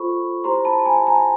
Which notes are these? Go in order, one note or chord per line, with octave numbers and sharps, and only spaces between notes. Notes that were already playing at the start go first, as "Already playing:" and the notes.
Already playing: F4 A4 C5 B5 C#6
E4 G4 C5 A#5 C6
A5 B5
G#5 A#5
G#5 A#5